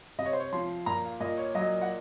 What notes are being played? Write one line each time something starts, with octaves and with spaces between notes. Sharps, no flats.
C3 D#5
C#5
C5
C#5
F3 C6
A#2 A#5
F5
A#2 D#5
C#5
F#3 D#5
F#5